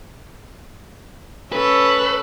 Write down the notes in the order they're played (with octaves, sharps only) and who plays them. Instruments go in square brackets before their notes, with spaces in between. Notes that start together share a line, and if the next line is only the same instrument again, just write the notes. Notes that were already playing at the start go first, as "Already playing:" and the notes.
[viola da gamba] C#4 A4 [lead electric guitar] B4